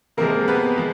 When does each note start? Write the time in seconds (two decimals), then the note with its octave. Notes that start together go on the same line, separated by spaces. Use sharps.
0.17 C3 F3 G#3 A#3 A#4
0.48 B3 B4
0.77 F3 G#3